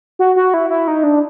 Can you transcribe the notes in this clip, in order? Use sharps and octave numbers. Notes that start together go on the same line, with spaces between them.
F#4
F#4
E4
E4
D#4
D4